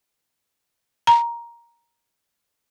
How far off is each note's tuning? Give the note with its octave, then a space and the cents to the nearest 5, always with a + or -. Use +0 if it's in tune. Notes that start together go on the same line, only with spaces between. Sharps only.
A#5 +10